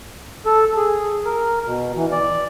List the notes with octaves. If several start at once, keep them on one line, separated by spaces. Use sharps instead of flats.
A4
G#4
A#4
B2
E3
D5